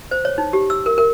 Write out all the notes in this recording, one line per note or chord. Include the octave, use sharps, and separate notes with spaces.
C5
C#5
D#4
G4
E6
A#4
A#4